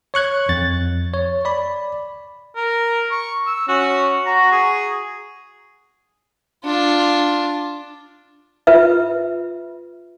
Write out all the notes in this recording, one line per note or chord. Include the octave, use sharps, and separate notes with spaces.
C#5 C#6 F#6 G#6
F2 A6
C#5
D5 B5
A#4
C#6
E6
C#4 F#4
F#4 A#5
G#4
D4 F4
F4 B4 E5